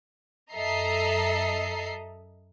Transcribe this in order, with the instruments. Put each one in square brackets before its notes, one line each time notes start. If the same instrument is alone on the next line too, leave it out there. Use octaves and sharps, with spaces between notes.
[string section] F#2 A4 D#5 E5 A#5 C7